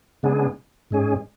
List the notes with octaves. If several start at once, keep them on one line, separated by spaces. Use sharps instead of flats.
C#3 G#3 B3 D4 G#4
G#2 G#3 C#4 G#4